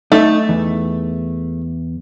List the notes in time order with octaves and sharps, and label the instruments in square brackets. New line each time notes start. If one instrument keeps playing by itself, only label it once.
[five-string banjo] A3 [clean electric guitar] D#4
[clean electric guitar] E2